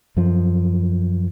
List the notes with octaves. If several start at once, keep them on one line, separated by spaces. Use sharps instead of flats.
F#2 F3